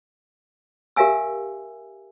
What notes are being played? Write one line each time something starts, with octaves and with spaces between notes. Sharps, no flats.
G4 A#4 E5 F5 G#5 E6